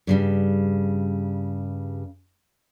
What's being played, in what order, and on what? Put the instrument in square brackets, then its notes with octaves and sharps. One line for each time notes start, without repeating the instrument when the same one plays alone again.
[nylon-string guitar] G2 C#3 G3